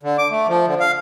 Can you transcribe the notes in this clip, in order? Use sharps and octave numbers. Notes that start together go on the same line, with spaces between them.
D3
D6
A3
F3
D3
F5